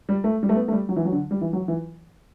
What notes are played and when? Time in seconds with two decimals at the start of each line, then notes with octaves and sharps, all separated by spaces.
0.09 G3
0.24 A3
0.43 G3
0.49 A3
0.56 B3
0.68 A3
0.72 G3
0.89 F#3
0.97 E3
1.05 F#3
1.12 D3
1.31 G3
1.41 E3
1.53 F#3
1.68 E3